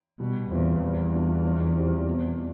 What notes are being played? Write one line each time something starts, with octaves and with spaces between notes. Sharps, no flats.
B2 G3
E2 C4 F4 B4
E2 G3
B3 D4 F4
F2
E3 G3 C4 G4
B2